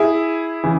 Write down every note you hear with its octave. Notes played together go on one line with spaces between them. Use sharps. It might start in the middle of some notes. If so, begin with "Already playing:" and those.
Already playing: E4 G#4
C#3 E3